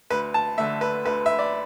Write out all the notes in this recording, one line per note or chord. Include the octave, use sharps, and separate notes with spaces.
D2 B4
A5
D3 A3 E5
B4
D2 B4
E5
D5